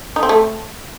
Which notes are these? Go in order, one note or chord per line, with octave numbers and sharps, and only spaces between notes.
D#4
C4
A3